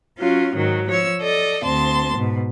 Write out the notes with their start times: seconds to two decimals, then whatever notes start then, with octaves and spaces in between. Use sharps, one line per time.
0.18 F#3 C#4 F4
0.55 G#2 D#3 F#3
0.88 F3 C#5 E6
1.21 A4 D5 D#5
1.64 D2 C4 A5 C6
2.16 G#2 B2